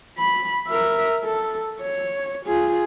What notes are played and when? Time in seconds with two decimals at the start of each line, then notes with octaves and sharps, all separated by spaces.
0.18 B5
0.68 A#4 E5
1.24 A4
1.81 C#5
2.46 F4 G#4